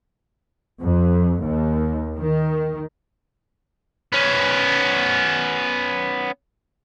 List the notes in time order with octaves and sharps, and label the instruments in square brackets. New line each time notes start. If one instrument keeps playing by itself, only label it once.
[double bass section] F2
D#2
D#3
[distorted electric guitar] B3 C#4